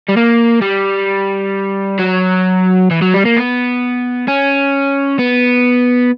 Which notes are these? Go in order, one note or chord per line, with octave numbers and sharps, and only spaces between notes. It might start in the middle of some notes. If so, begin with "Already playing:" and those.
G3
A#3
G3
F#3
E3
F#3
G3
A#3
B3
C#4
B3